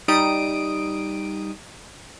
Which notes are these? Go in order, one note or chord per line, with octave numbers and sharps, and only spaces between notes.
G3 D#4 D#6 D7